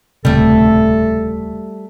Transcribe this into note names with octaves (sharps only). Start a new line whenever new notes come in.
D#1 C#2 C3 G3 A3 A4